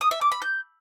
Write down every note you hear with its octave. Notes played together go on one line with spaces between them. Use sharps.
D#6
E5
D6
B5
G6